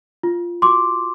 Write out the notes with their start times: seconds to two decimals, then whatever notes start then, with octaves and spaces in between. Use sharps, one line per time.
0.23 F4
0.62 F#4 C6 D6